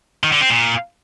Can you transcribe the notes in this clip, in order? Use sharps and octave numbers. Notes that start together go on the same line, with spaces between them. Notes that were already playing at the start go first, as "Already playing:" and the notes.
D#3
D3
C4
A#2